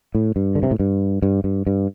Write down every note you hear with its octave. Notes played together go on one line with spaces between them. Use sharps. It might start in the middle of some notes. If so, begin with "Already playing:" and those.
A2
G2
D3
C3
A2
G2
G2
G2
G2